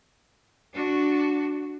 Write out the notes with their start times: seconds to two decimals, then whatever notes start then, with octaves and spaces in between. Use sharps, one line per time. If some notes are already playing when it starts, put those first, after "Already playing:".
0.74 D4 F#4